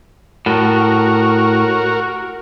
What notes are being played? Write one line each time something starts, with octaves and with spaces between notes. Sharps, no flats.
A2 F#4 A#4